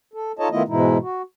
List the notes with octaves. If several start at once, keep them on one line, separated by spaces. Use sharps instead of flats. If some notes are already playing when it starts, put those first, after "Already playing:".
A4
D#4 F4 A4 C#5 D#5 A5
D#3 A3 B3 E4 F4 D#5
G#2 B2 E3 G#3 D#4 E4
F#4